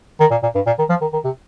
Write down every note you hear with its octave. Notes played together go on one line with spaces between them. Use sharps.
D#3
A#2
A#2
G2
A#2
D#3
F3
D#3
D#3
C3